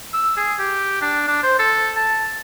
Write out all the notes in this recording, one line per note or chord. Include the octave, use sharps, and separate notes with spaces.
E6
G#4
G4
D4
D4
C5
A4
A5